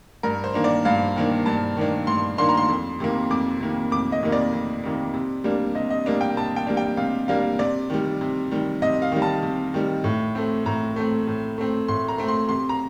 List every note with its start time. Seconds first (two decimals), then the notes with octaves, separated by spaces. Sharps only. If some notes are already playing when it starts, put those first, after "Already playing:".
0.23 G2 A#4
0.44 C5
0.54 D#3 A#3 D4
0.64 D5
0.85 G2 F5
1.16 D#3 A#3 D4
1.46 G2 A5
1.77 D#3 A#3 D4
2.07 G2 C6
2.38 D#3 A#3 D4 C6
2.49 A#5
2.57 C6
2.69 F2
3.00 C3 D#3 A#3
3.30 F2 D6
3.60 C3 D#3 A#3
3.91 F2 D6
4.12 D#5
4.23 C3 D#3 A#3
4.32 D5
4.53 F2
4.84 C3 D#3 A#3
5.14 C3
5.44 G3 A#3 D4
5.75 C3 D#5
5.90 D#5
6.06 G3 A#3 D4
6.21 G5
6.37 C3 A5
6.56 G5
6.67 G3 A#3 D4
6.77 G5
6.97 C3 F5
7.28 G3 A#3 D4 F5
7.59 C3 D5
7.90 D#3 G3
8.21 C3
8.51 D#3 G3
8.82 C3 D#5
9.02 F5
9.12 D#3 G3
9.22 A5
9.42 C3
9.74 D#3 G3
10.04 A2
10.35 A3 C4
10.66 A2 A#5
10.96 A3 C4
11.27 A2
11.58 A3 C4
11.88 A2 C6
12.08 A#5
12.18 A3 C4
12.28 C6
12.49 C3 C6
12.69 A#5